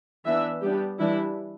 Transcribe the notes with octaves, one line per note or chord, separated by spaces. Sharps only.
E3 B3 D4 E5
G3 B3 D4 G4
E3 G3 D4 E4